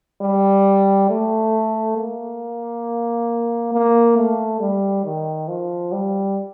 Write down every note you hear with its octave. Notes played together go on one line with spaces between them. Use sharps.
G3
A3
A#3
A#3
A3
G3
D#3
F3
G3